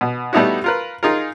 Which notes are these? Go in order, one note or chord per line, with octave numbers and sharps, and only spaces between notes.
B2
G3 A3 B3 D#4 E4 F#4
F4 A#4 B4
D#4 F4 G#4 A#4